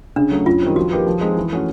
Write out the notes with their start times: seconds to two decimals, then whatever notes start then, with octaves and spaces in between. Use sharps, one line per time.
0.16 C#3 D4
0.31 F#3 A3
0.46 F#2 F4
0.62 D#3 G3 C4
0.76 F3 F#4
0.91 A#3 D#4 G4 B4
1.07 F3
1.21 G#3 C4 D#4 G#4
1.37 E3
1.52 A3 C#4 F#4